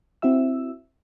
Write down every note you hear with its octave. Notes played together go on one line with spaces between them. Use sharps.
C4 E4 F#4 E5 E6